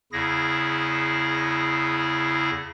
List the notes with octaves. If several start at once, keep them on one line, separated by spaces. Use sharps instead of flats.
E2 C#3 E4 G#4 A#6